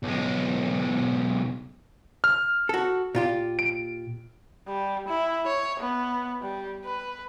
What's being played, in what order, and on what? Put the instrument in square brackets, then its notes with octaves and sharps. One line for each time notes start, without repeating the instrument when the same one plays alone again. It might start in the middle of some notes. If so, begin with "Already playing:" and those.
[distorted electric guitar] B1 G#3
[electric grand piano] F6
[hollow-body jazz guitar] F#4 A4
A#2 F4 G4
[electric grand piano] D7
[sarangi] G3
E4
C#5
B3
G3
B4